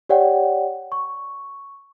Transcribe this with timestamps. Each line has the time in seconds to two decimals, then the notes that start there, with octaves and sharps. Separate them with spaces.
0.09 G4 C#5 D5 F#5 G5
0.92 C#6